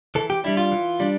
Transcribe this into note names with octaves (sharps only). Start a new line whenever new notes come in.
E3 A4
G4
G3 D4 E4
F4
E3
G3 D4